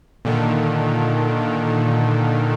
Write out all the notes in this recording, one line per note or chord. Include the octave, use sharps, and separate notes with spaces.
A#2 D3 D#3